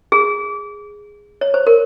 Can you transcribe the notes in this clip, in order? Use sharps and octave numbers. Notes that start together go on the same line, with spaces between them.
G#4
C#5
C5
A#4